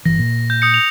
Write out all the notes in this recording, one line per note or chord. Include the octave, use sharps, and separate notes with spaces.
G1 E3 A#6
A#2
G6
D#6 G6 C#7
F7